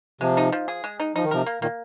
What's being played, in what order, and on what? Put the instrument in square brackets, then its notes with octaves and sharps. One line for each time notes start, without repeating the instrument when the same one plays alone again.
[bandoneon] C3 F3 [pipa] G#3
[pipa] D#4
F3
G#4
G#3
D#4
[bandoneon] F3 [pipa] D#4
[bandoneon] D#3
[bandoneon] C3 F3 [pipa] A#4
[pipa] A#3
[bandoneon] A#2 D#3 [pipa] A#3